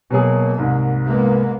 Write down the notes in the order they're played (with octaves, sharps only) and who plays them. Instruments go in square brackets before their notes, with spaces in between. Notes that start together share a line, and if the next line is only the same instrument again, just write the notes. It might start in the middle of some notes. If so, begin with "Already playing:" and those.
[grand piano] B2 F#3 G#4 [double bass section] A#3
[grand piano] C2 G#2
[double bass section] G#3 A#3 B3